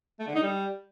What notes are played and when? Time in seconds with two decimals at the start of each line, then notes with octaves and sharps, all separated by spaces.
0.20 A3
0.27 D3
0.35 D#4
0.43 G3